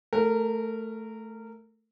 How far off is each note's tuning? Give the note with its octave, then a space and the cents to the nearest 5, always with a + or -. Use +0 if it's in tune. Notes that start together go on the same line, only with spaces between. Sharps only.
A3 +0 A#4 -20